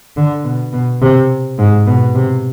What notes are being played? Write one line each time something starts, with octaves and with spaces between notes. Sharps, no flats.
D3
B2
B2
C3
G#2
B2
C3